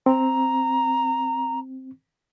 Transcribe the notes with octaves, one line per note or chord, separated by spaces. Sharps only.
C4 A#5